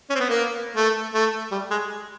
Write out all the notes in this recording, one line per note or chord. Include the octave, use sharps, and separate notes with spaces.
C#4
C4
B3
A#3
A3
A3
G3
G#3